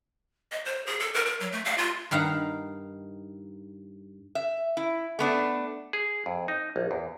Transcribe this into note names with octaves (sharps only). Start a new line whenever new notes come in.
D#5
C5
G#4
A4
A#4
A#4
F#3
A3
F5
F4
G2 D#3 F5 F#5 A#5
E5
E4
A3 B3 D4
G#4
F2
D#4
A#1
E2